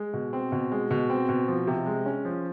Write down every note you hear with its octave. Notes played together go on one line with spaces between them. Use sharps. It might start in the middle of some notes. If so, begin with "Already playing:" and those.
Already playing: G#3
B2
C4
B2
G#3
B2
C4
B2
F3
C3
G#3
C#4
F3